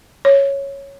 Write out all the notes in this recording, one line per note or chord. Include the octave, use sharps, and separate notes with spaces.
C#5